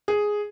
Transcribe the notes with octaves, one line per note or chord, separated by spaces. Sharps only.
G#4